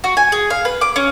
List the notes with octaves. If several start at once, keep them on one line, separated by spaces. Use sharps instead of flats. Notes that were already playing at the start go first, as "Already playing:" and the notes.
F#4
G#5
G#4
F5
B4
D6
C#4